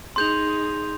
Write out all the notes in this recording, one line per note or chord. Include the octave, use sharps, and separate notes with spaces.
D#4 G#4 C6 G6 F7